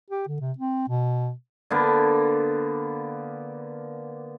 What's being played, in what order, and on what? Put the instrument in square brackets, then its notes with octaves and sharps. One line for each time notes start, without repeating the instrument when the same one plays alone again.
[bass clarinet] G4
D3
C3
C4
B2
[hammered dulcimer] D3 A#3 B3